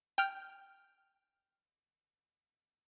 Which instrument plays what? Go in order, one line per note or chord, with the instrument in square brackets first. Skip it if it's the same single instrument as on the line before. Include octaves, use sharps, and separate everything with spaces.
[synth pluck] G5 F6 G6